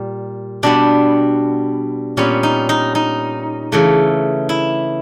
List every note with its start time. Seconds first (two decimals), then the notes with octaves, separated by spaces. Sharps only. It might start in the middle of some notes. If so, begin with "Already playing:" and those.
Already playing: A#2 G3
0.63 B2 G3 B3 D4
2.17 A#2 G3 B3 C#4
2.43 D#4
2.69 D#4
2.95 D#4
3.72 C#3 E3 A3
4.49 E4